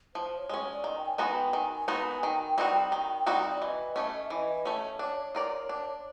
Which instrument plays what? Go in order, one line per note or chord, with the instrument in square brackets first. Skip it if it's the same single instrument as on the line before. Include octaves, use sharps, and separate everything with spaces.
[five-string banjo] F3 [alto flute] C5
[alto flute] C#5
[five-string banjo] G#3 C#4
[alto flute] C#5
D5
[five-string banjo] D#3 [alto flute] D#5
[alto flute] G5
G#5
[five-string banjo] G#3 B3 D#4 F#4 [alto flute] G#5
[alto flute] G5
[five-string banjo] D#3 [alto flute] G#5
[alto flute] G#5
[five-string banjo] G#3 B3 D#4 F#4
[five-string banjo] D#3 [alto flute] G5
[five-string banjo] G3 C4 D#4 F#4
D#3
G3 C4 D#4 F#4
[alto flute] D5
[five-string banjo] E3 [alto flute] D#5
[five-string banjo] A3 C#4
[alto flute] E5
[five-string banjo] E3 [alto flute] D#5
[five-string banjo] A3 C#4 [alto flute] C#5
[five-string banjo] D4
F4 A#4 D5
D4